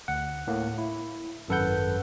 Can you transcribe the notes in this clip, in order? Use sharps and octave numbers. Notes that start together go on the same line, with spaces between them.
D2 F#5
A2 A#3
E4
G#1 F#2 A4 B4 F#5 G6